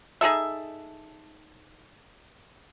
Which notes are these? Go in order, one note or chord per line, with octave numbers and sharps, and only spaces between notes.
D#4 G#4 A4 E5